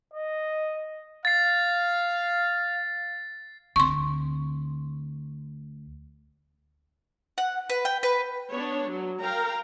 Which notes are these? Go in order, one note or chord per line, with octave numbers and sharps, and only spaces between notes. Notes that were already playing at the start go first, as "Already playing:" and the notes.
D#5
F5 A6 C7
D2 C4 C6 C#6
F#5
B4
G5
B4
B3 D4 C#5
F#3
A#4 F5 G5 A#5